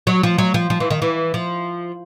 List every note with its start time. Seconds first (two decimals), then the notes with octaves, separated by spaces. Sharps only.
0.07 F#3
0.23 F3
0.38 F#3
0.54 F3
0.70 F3
0.80 E3
0.91 D#3
1.02 E3
1.34 F3